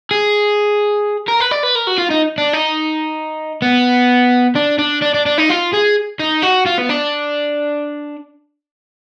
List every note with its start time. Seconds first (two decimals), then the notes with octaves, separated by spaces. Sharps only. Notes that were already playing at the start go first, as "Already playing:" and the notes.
0.11 G#4
1.28 A#4
1.40 B4
1.51 D5
1.63 B4
1.75 A#4
1.87 F#4
1.98 F4
2.10 D#4
2.38 D4
2.53 D#4
3.62 B3
4.55 D4
4.79 D4
5.02 D4
5.14 D4
5.26 D4
5.38 D#4
5.49 F4
5.73 G#4
6.19 D#4
6.43 F#4
6.67 F4
6.79 B3
6.90 D4